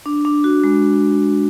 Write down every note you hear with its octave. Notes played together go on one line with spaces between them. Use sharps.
D4
D4
F#4
G#3